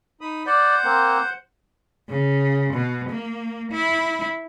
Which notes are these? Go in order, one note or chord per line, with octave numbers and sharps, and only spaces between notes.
D#4 B5 D#6
C5 D5 F#5 G6
A#3 C4
C#3
B2
A#3
E4